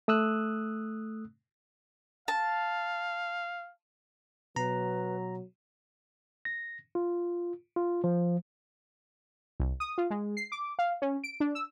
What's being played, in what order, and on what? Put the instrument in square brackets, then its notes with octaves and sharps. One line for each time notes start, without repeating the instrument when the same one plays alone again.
[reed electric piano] A3 D#6 E6 F#6
[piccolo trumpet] F5 [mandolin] A5
[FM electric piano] B2 [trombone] F#3 [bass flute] B4 [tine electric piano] A#5
[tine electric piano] A#6
F4
F4
F3
[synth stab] C2
D#6
F4
G#3
C7
D6
F5
C#4
D7
D4
E6